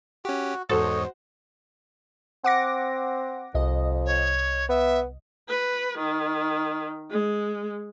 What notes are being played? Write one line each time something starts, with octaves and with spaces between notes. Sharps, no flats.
C#4 F#4 G4
E2 G#2 F#4 A4 C5 C#5 D#5
C4 F#5 D6 A#6
C2 F2 D#5
C#5
B3 E5
B4
D#3
G#3